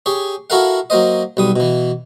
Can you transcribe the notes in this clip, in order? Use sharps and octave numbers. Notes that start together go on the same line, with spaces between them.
G4 G#4 C#5
E4 F#4 A4 A#4 F5 F#5
F#3 A#3 C5 D#5
B1 G3 D#6
B2 E3